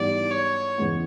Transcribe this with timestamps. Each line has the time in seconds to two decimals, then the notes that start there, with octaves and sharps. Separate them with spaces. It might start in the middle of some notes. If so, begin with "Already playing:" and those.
Already playing: G#2 E3 G3 B3 E4 D5
0.31 C#5
0.78 E2 C#3 E3 G#3 B3